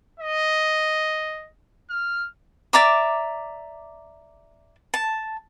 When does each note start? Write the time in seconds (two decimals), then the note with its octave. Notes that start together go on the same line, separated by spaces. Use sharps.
0.20 D#5
1.90 F6
2.73 D5 E5 A#5 D6
4.94 A5